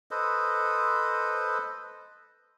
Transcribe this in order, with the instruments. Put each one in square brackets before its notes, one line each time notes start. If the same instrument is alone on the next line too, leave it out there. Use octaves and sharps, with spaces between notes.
[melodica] A4 B4 C5 D#5